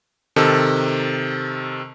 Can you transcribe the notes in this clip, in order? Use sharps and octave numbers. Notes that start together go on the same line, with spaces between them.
C3 D#3 A4